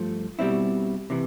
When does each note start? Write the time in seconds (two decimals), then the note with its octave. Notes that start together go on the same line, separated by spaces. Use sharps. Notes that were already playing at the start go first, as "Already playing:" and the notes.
Already playing: G2 F3 A3
0.39 B2 G3 C4 E4
1.10 C3 E3